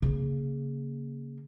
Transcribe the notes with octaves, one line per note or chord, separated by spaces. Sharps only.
C#3 A#3